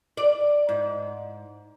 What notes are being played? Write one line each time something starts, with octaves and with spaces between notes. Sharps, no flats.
D5
G#2